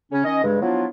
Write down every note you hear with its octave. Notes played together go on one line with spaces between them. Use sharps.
C#3 C#4
D#3 C#4 D#5
G2 C#3 G#3
F3 F#3 B3 D4 E4 F4